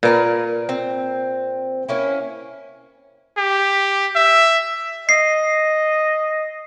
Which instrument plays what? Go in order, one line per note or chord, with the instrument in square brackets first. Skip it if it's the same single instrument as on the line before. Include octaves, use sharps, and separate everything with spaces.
[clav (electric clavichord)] A#2 [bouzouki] A#3 A#4 B4
[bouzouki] C4
A#3 C#4 E4
[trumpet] G4
E5
[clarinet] D#5 [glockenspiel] C7